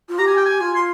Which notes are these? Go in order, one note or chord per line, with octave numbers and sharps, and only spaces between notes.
F4
G4 A#5
G#5
G5
G#5
F4 G#5
C6